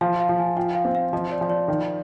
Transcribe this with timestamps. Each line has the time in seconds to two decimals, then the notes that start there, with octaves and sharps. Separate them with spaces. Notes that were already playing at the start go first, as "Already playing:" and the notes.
0.01 F3 F5
0.20 F5
0.29 F3
0.38 G#5
0.57 F4 G5
0.75 F5
0.85 C4
0.95 F5
1.13 F3 D#5
1.31 D5
1.41 F3
1.50 D5
1.68 D#3